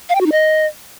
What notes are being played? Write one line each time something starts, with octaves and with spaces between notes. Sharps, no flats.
F5
G5
F#4
D#4
D#5